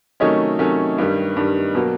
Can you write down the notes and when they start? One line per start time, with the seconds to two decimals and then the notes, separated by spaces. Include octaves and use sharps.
0.20 C3 D#3 F#3 A3 C#4 C#5 D#5
0.59 C3 D#3 F#3 A3 C#4
0.98 G2 D#3 G3
1.37 G2 D#3 G3
1.75 B2 F#3 A#3